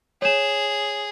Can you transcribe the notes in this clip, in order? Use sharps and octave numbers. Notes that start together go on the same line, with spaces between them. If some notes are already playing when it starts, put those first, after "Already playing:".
G#4 C#5 E7